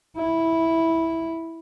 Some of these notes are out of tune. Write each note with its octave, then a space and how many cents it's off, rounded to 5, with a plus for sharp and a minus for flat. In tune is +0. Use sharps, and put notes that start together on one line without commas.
E4 -10